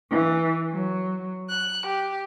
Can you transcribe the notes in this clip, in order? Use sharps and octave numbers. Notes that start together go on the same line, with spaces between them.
E3
F#3
F#6
G4